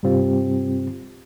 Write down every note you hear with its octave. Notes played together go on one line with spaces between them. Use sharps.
G2 C3 G3 C4 F4 G4